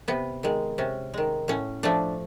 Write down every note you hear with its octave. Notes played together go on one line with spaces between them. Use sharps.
C3 B3
D#3 G#3
C3 C#4
D#3 G#3
A2 C#4
F3 A3 D4